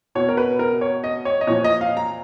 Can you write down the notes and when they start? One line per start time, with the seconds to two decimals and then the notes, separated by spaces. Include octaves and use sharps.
0.15 B2 C#5
0.29 A#4
0.37 B4
0.59 A#4
0.81 C#5
1.04 D#5
1.25 C#5
1.41 D#5
1.47 A#2 F3 C#5
1.64 D#5
1.81 F5
1.97 A#5